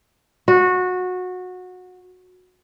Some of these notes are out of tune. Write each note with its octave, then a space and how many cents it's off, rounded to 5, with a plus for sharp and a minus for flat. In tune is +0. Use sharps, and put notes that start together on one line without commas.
F#4 -20